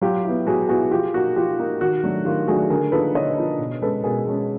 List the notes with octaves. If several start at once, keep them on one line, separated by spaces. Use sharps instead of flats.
F#3 F4 G4
B3 E4
F#3 F#4 G#4
B3 E4 F#4 G#4
F3 F4 G4
A#3 D#4 F#4
F3 F4 G4
A#3 D#4
D#3 F#4
F#3 A3 D4
D#3 F4 G4
F#3 A3 D4 F#4 G#4
D3 G#4 A#4
F3 A#3 D#4 A4 B4
D3 C#5 D#5
F3 A#3 D#4
B2
G#3 C#4 A4 B4
B2 G#4 A#4
G#3 C#4